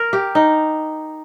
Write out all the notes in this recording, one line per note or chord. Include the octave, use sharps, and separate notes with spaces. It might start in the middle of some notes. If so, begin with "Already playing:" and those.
Already playing: A#4
G4
D#4